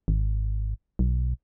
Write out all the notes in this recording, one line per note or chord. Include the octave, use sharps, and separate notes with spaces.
G#1
B1